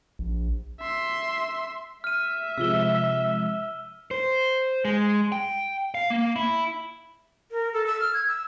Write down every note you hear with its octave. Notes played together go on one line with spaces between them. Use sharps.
A#1
E5 C6
E5 F6 D#7
C3 F3 G#3 E6 G7
C5
G#3
G5
F5
A#3
E4
A#4
A4
E6
F6
G#6
E6